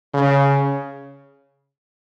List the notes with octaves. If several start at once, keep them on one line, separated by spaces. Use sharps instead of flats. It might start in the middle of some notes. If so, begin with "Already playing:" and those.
C#3